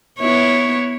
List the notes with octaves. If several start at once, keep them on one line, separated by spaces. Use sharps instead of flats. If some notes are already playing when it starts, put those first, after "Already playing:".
B3 E4 C#5